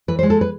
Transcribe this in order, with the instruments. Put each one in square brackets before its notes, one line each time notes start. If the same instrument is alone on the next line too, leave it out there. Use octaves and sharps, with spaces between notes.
[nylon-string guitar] E3 B4
C5
G#3
A4
B4